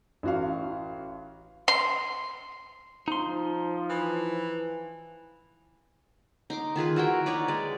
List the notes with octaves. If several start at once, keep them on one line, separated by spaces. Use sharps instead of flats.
A1 F#4 F5
C6
F3 D#4 C6
E3
D#4 C6 D6
D#3 F4 G#4 B4
E4 F#4 A#4 G5
D#4 B4 C#5 D5
G#3 D5